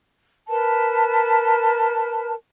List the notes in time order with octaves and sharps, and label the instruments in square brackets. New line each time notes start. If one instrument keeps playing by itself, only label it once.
[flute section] A#4 B4 A5